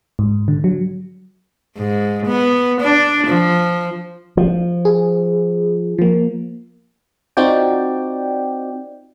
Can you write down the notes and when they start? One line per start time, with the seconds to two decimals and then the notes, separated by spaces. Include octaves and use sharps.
0.19 G#2
0.48 D3
0.64 F#3
1.78 G#2
2.26 B3
2.80 D4
3.27 F3
4.37 F3
4.85 G#4
5.99 F3 A#3
7.37 C4 D#4 F4 F#4 D5 G5